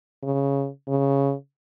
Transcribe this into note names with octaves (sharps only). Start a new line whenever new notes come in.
C#3
C#3